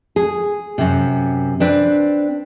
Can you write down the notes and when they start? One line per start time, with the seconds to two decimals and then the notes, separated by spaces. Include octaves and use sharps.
0.16 G#4
0.78 F#2 C3
1.60 C4 D4 B4